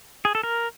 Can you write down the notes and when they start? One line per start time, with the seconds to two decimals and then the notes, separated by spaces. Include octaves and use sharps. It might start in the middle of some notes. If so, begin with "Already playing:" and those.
0.25 G#4
0.35 A4
0.43 A#4